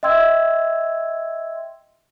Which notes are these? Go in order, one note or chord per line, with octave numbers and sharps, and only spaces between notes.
D#5 E5 G5 C6 E6 G#6